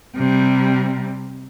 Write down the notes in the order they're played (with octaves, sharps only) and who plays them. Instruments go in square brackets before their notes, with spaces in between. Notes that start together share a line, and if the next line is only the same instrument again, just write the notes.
[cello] C3 G3